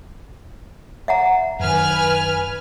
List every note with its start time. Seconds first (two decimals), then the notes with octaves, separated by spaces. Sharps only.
1.08 E5 F#5 A#5
1.60 F#2 D#3 B4 G#5 F6